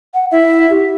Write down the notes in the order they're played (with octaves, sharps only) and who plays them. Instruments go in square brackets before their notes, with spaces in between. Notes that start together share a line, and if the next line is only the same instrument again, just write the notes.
[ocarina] F#5
[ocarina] E4 [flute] E5
[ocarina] G4